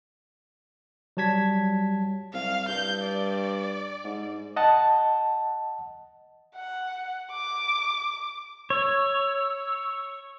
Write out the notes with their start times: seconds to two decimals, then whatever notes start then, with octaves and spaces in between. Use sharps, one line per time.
1.17 F#3 G3 A5 G#6 B6
2.33 C2 F5
2.68 G2 G6
3.03 D5
4.04 G#2
4.56 D#5 F#5 A5
6.55 F#5
7.32 D6
8.70 C#5 E6